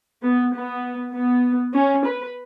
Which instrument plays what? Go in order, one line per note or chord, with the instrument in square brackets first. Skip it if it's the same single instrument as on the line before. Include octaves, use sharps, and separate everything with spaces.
[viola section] B3
B3
B3
C#4
B4